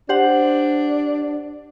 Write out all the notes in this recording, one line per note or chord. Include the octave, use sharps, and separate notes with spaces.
D4 G4 C5 F#5